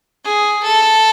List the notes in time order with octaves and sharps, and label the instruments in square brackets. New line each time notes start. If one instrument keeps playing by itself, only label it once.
[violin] G#4
A4